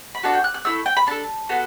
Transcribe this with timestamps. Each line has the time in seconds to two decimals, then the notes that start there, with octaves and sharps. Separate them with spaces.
0.15 B5
0.23 D4 F#4 A4 A5
0.34 G5
0.44 F#6
0.54 F#6
0.65 A3 E4 A4 E6
0.86 G5
0.97 B5
1.07 D4 A4 A5
1.49 B3 F#4 A4